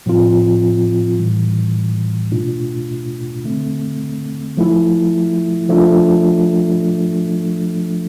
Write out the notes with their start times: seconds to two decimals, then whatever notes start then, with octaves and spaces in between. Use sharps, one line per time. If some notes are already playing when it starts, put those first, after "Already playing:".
0.06 A2 F3 C4 F4
1.19 A2 E3 G3
2.32 B2 A3 D4 F4
3.44 D3 A3 C4
4.57 F3 A3 E4
5.69 F3 A3 D4 F4